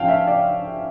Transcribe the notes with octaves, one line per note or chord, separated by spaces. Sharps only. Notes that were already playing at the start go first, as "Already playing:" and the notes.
Already playing: F3 C#4 F4 F5 G5 A5
E5
D5